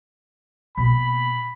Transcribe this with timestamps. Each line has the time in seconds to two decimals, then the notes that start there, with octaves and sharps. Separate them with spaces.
0.78 B2 A#3 B5